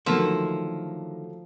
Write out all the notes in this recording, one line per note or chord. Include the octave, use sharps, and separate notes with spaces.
D3 D#3 F3 F#3 A3 A#3 E5